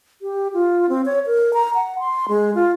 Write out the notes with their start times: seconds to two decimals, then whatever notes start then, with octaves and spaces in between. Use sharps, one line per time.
0.22 G4
0.54 F4
0.89 C4
1.06 C#5
1.26 A#4
1.54 A#5
1.75 F#5
1.99 C6
2.29 G#3
2.55 F4